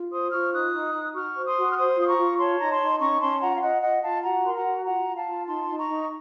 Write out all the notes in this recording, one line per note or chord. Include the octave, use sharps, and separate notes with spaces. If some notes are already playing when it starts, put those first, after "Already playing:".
Already playing: F4
C5 C6 D#6
F4 C#6 F6
D#4 D#6 F#6
D#4
D#4
F#4 C#6 F6
C5
C6 D#6
F#4
F6
C5 C6 D#6
F4 D#6
A#5 C#6
F4
C#5 A5 C6
D#4 A#5
A5 C6
D#4
C#4 A#5 C#6
C#4 A5 C6
F4 F#5 A#5
F5
F4 D#5 F#5
F4 D#5 F#5
F4 F5 A5
F#4 F#5 A#5
A#4 C6
F#5 A#5
F#4
F4 F#5 A#5
F4
F5 A5
F4
D#4 A5 C6
D#4
A#5 C#6
D#4